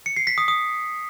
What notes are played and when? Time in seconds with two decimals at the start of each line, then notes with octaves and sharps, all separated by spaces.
0.06 C#7
0.17 C7
0.27 B6
0.38 D#6
0.48 D#6